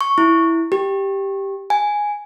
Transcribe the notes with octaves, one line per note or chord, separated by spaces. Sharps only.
C#6
E4
G4
G#5